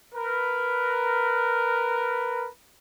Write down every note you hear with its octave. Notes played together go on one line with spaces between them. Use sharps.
A#4 B4